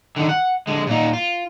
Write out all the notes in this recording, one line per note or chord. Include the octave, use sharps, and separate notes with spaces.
D3 D#3
F#5
D3 G#3
A#2 D#4
F4